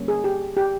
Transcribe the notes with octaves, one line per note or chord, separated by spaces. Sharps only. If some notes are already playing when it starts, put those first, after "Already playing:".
Already playing: D3 G3 A#3 C#4
G#4
G4
G4